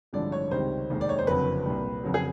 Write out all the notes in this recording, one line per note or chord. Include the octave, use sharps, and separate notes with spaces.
A1 G2 D3 F3 G#3 D5
C#5
C#2 C3 D#3 G3 C5
F1 D#2 D#3 G#3
D5
C#5
C5
F#1 F2 D3 F#3 B4
C2 A#2 G3
F2 C#3 F#3
G#4